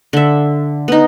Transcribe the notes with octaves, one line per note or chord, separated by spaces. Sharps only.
D3 E5
B3 D#4